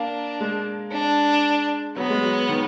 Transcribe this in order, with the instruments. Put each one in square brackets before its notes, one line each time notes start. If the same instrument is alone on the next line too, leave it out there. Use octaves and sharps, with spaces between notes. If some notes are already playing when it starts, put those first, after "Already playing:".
Already playing: [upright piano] A#3 [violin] D4
[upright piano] G#3
[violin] D4
[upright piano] F#3 [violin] B3
[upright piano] G#3
F#3
D#3